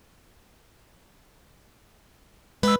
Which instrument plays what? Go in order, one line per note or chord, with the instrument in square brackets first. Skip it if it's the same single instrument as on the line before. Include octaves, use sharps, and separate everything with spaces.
[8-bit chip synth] G#3 E6 [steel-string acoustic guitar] B4